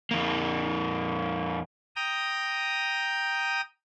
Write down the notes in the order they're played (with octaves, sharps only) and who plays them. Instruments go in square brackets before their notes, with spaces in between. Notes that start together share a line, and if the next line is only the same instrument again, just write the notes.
[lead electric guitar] F2 A#3
[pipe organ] G5 A#5 D#6